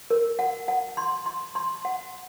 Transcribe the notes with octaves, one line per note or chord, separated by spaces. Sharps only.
A#4
F#5
F#5
C6
C6
C6
F#5